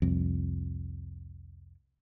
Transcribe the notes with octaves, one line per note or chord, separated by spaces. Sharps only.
C2 F2